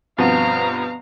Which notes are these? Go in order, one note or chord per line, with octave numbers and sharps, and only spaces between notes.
G2 B2 F3 B3 C4 F5 F#5 A#5